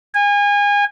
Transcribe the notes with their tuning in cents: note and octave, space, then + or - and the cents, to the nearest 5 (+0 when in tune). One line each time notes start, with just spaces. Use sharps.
G#5 -30